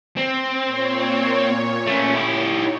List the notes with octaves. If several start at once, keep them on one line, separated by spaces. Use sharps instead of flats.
C4
A#2 C#5
A3 C#4
E4 G4
D#4 C#5